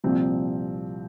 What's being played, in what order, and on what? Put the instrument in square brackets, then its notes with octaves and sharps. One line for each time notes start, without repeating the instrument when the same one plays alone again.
[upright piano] C2 A#2 F3 C4